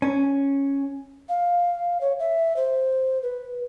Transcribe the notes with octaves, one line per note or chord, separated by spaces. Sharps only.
C#4
F5
C#5
E5
C5
B4